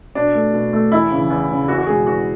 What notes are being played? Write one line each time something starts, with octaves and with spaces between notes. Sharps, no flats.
B2 D4
A3
B2
A3
E2 E4
C#3 E3
E2
C#3 E3
E2 F#4
F#4
B2 G#3 G#4
E2 F#4